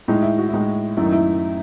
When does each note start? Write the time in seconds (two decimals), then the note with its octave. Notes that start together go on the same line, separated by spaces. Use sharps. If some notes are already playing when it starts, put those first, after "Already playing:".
0.08 A2 G#3 D#4
0.23 E4
0.38 F#4
0.49 E4
0.53 A2 G#3 D#4
0.97 F#2 D#3 A3 E4
1.06 D#4
1.12 E4